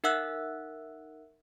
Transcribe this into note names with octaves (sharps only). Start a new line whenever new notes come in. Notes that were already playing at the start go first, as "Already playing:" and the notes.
D#4 A#4 E5 F#5 E6 F#6